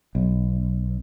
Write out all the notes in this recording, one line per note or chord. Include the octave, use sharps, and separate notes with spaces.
B1